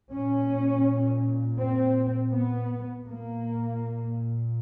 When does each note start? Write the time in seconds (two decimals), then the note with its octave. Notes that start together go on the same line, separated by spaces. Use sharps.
0.13 A#2 C#4
1.59 C4
2.32 B3
3.06 A#2 A#3